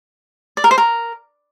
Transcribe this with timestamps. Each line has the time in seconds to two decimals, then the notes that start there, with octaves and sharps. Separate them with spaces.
0.57 D5
0.64 A#4
0.71 C5
0.78 A#4